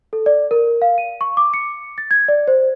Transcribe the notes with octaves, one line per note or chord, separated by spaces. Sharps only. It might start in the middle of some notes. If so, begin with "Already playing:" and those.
A4
D5
A#4
F5
D#7
C#6
D6
C#7
A6
G#6
D5
C5